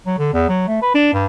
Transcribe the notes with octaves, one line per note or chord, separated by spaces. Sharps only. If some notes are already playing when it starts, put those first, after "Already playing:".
F#3
D3
E2
F#3
A3
B4
D4
G2